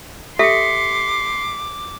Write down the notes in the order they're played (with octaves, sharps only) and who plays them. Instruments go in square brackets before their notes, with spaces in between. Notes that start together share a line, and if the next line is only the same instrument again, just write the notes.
[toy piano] G4 A4 E5 [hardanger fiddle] C6 [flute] D6 [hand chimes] B6 C#7